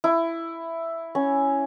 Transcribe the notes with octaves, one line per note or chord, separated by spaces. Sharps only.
E4
C#4